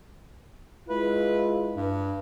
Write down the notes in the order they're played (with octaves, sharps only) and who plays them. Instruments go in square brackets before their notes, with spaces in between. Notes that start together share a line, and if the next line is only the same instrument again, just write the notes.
[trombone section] G#3 E4 F4 [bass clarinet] B4
[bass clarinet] G2